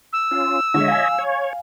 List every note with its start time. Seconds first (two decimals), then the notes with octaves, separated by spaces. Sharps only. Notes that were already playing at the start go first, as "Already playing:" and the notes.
0.13 E6
0.31 C#4 F4
0.74 D3 G#3 C#5 D#5 E5
0.88 F5 G#5
1.18 C#5